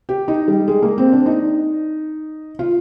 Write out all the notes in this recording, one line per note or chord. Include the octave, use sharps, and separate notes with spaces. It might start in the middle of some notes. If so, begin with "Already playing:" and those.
G4
D#4
G3
G#3
A#3
C4
D4
D#4
F4